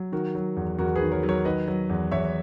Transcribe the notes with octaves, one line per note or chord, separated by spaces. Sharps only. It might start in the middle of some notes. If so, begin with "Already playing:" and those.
Already playing: F#3
D#3 F#4 A#4
F#3
E2
E2 F#4 A#4
G#4 B4
D#3
A#4 C#5
F#3
A#4 C#5
D#3 B4 D#5
F#3
E2
E2 C#5 E5